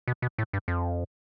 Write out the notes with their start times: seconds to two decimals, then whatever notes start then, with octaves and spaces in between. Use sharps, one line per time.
0.08 B2
0.22 B2
0.38 A2
0.53 G2
0.68 F2